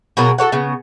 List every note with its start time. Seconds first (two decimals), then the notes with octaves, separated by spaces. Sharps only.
0.17 B2 F#3 A#3 G#4
0.38 F#4 A4 C#5 F#5
0.52 C#3 B3